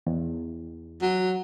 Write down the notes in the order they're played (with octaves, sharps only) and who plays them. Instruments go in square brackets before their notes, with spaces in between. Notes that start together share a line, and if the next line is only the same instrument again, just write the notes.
[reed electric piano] E2
[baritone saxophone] F#3